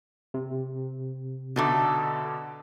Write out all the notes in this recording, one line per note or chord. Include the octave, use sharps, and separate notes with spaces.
C3
B2 D3 A3 D#4 A4 D6